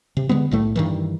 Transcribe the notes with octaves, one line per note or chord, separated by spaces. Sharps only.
C3
D3 G#3 B3
B1 A2 A3
G2 D#3 E3